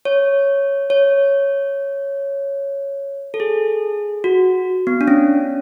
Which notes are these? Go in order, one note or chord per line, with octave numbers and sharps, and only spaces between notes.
C#5
C#5
A4
G#4
F#4
B3
D4
C#4